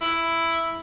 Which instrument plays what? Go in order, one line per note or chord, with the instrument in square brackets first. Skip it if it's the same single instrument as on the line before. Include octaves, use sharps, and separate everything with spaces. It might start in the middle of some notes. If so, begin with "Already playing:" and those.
[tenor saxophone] E4